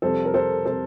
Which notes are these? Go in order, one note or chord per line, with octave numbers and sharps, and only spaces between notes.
F2 C3 G3 A4 C5
A#4
A4 C5
C3 G3 A4 C5